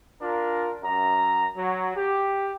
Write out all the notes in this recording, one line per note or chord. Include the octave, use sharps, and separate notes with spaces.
D4 F4 A#4
F#2 A#5
F#3
G4